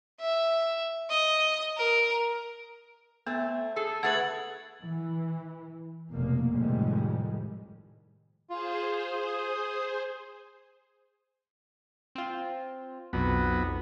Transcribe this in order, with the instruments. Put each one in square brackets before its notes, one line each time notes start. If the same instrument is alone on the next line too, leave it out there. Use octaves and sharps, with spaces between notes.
[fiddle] E5
D#5
A#4
[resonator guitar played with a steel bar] A3 C4 [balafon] B3
[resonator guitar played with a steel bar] G#4 [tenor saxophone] A4
[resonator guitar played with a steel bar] A3 G#4 B4 [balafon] F#5 [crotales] G#6 A6 F#7
[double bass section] E3
F1 B2 A#3
F1 F2 A2 D#3 G3 G#3
[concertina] F4 [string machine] G#4 C5
[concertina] D#6
[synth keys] C4 F4
[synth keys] B1 F2 [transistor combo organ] F#3 B3